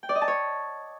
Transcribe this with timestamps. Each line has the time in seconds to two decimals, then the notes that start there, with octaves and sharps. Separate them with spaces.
0.03 G5
0.09 D5
0.15 D#5
0.22 A5
0.28 C#5